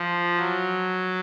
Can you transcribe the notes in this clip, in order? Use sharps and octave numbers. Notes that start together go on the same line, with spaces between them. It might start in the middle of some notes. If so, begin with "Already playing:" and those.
Already playing: F3
F#3